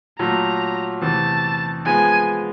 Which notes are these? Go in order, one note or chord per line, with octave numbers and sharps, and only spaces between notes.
A#2 F#3 A3 A#5
E2 C3 E3 A3 A5
F3 G#3 B3 G#5